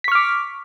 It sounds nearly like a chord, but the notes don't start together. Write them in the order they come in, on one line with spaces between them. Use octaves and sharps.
B6 C#6 F6 D6